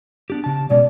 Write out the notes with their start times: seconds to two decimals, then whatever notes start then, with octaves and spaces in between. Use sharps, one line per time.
0.30 B3 D4 G4
0.44 C#3 A5
0.70 B2 G#3 C#4 D5